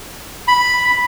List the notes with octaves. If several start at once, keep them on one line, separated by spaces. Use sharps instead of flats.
B5